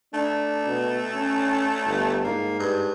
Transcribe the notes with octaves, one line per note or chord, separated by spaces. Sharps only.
A3 D4
B2
C#4
G1
G#2 A#3
G2